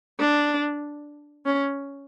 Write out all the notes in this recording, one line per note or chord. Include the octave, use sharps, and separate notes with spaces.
D4
C#4